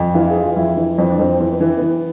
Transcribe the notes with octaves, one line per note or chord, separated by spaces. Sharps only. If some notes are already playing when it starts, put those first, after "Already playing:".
Already playing: F2
E3 F4
G#4
E3
F4
F2 E4
E3
F2 C4
D4
F2 C4
E3 C4
B3
E3
E3 B3